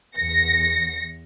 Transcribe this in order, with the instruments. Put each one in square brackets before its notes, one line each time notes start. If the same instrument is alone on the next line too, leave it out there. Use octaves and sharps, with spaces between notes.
[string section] E2 A#6 C#7